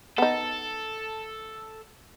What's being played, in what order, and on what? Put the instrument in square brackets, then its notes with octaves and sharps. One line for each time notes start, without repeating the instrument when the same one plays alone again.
[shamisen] B3 D#4 [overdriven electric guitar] A4